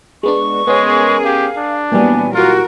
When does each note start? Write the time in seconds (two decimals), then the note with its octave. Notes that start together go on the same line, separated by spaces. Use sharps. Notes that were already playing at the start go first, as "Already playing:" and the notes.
0.23 G#3 B3 D4 C#6
0.67 G#3 B3 C#4 G#4 A#4
1.24 G4 F5
1.57 D4
1.92 A#2 E3 F#3 G3 B3 G#5
2.34 F4 F#4 A#4